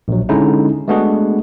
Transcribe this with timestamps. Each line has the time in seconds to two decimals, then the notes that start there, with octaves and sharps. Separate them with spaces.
0.08 A#1 F#3
0.29 D3 G#3 C#4 D#4 E4
0.88 G#3 A3 B3 D4 F#4 G#4